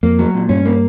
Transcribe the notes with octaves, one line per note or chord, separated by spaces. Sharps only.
F2 A#3
F#3
A#2
G2 C#4
A#3